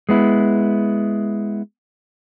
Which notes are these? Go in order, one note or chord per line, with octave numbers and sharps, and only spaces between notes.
G#3 B3 E4